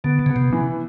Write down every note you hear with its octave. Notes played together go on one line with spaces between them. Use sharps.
D3 B3
C#3 B3
C3
E3